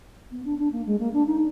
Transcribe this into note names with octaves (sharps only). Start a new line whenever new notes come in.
B3
D4
D4
A#3
G#3
A#3
D4
D#4